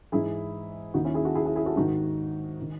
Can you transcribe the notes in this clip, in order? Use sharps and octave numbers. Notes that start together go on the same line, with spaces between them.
G#2 E3 E4 G#4
D#2 D#3 D#4 F#4
C#4 E4
E4 G#4
F#4 A4
E4 G#4
E4 G#4
E4 G#4
F#4 A4
G#2 D#3 D#4 F#4
D#3